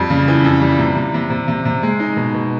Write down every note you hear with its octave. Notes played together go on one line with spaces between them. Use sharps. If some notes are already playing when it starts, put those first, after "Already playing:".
Already playing: F2 G3
C#3
E3
F2
G3
C3
C3
C3
C3
C3
C3
G#3
D#4
B2
B2